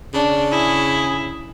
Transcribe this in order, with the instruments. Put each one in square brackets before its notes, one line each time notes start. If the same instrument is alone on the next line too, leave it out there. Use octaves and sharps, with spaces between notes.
[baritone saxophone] C#3 [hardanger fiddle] D4
[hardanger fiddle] E4 [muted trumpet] G#4